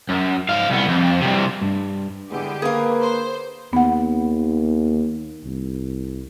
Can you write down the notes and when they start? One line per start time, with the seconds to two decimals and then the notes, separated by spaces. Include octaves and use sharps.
0.09 F#2
0.49 G#2 F5
0.70 C2 B3
0.89 F2
1.22 G2 C3
1.61 G2
2.31 E2 D3 G#3 B3 G4
2.62 A#3 G#4 B4 F5
3.01 C5
3.73 D#2 B3 F#5
5.44 C2